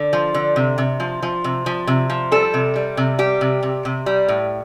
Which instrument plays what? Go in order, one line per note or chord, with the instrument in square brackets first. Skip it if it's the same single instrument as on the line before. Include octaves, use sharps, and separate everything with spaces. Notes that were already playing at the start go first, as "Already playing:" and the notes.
Already playing: [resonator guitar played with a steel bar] D3
F3
D3
C3
C3
F3
F3
C3
F3
C3
F3
G3 A4
C3
G3
C3
G3 G4
C3
C3
C3
G3
A2